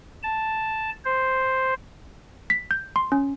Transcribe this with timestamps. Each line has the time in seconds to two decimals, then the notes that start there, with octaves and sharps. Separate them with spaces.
0.23 A5
1.05 C5
2.50 B6
2.71 G6
2.96 C6
3.12 C#4